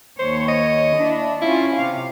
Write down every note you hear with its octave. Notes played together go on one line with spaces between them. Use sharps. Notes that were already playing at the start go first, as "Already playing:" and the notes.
D#2 C5 C#5
D#5
D4 E4
C#4 E4 F4
C3 F5